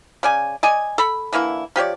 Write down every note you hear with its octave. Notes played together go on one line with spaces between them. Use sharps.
C#3 D5 G#5
D5 D#5 G#5
A4 B5
D3 E3 A#3 E4
F3 G4 C#5 D5